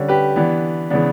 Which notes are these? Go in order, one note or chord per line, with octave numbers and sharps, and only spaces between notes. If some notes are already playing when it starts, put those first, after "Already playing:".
Already playing: D3 G3 C#4
G4 B4
E3 B3 D4
C#3 E3 B3 D4